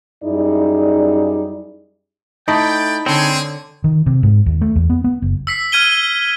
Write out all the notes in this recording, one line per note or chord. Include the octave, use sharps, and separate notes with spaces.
F#2 G3 D#4 E4 G#4 D5
A3 D#4 E4 D5 D#5 G5 B5
D3 G#3 C4 G#4 C#5
D#3
C3
G#2
D#2
A3
E2
B3
B3
F#1
E6 B6 C7
F6 G#6 D#7 G7